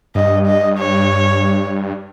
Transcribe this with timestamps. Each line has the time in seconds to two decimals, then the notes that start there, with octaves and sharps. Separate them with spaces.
0.15 G2 D#5
0.46 D#5
0.79 C#5